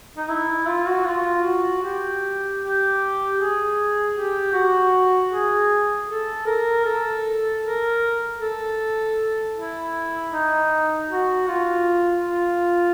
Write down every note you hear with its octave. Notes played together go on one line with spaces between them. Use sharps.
D#4
E4
F4
F#4
F4
F#4
G4
G4
G#4
G4
F#4
G#4
A4
A#4
A4
A#4
A4
E4
D#4
F#4
F4
F4